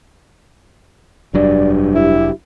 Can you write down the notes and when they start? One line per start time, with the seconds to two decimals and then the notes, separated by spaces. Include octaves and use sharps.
1.34 F1 G2 F#3 D4 D5
1.95 E4 G4